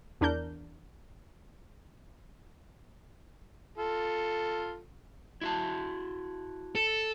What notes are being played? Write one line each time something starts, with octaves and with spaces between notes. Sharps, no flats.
E2 D4 A#4 G6
F4 A4
E4 F#4 A5
A4